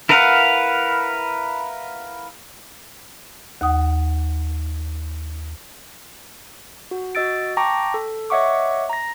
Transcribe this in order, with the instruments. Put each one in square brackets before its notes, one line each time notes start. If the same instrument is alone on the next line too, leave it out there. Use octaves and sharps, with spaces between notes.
[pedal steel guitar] E4 A#4 B4 F5 F#5
[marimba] D#2 F#5 D#6
[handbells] F#4
F#4 D#5 E6 A6 D7
G5 A5 A#5 C#6 D6 A#6
A4
C#5 D#5 E5 F#5 C#6 D6
A#5 A#6